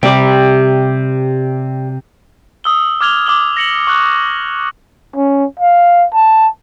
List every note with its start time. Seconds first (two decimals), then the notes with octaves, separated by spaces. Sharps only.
0.03 C3 G3 G4 D5
2.64 D#6 E6 G7
3.01 D6 F6 G#6 F7 G7
3.26 D6 D#6 F#7 G7
3.57 A#6 C#7 F#7
3.87 C#6 F#6 F#7
5.16 C#4
5.60 F5
6.14 A5